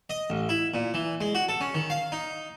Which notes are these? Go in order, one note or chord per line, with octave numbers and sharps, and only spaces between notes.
D#5
A1
E4
A#2
E3
G#3
F#4
A4
C#4
D#3
F5
D#4